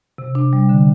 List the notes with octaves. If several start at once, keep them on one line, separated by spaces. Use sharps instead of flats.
C3
D4
G3
D3